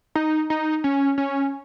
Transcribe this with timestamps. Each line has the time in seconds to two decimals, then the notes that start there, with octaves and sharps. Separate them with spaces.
0.15 D#4
0.50 D#4
0.84 C#4
1.18 C#4